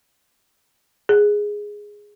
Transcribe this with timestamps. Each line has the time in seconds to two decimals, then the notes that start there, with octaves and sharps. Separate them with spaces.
1.09 G#4